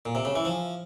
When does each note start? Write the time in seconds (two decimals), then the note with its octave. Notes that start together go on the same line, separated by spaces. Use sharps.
0.06 A#2
0.15 C3
0.25 C#3
0.36 E3
0.45 F3